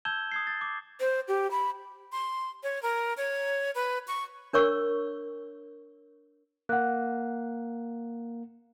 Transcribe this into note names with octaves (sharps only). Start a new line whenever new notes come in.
A5 E6 G6 G#6 E7 G7
D#6 G#6 C7
A6
D6
C5
G4
B5
C6
C#5
A#4
C#5
B4
C#6
D4 A#4 C#5 C#6 E6
A#3 F#5 F#6